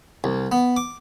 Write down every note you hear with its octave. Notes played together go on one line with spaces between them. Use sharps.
C2
B3
D6